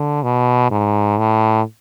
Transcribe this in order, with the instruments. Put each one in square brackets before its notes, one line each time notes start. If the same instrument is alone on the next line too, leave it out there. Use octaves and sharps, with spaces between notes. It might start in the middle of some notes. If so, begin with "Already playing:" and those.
Already playing: [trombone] D3
B2
G#2
A2